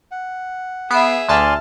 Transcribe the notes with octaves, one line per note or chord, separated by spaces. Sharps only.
F#5
B3 G#4 E5 C7 D7
D2 D5 G#5 A5 C6 F6